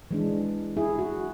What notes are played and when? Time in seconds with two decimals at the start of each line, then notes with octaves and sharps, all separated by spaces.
0.11 E3 G#3 D4
0.77 E4 G#4
0.99 F#4